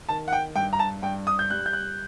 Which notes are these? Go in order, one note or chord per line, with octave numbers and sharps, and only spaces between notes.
D#3 A5
F#5
G5
G2 G5
A#5
A5
G2 G5
D#6
G6
G3 F#6
G6
F#6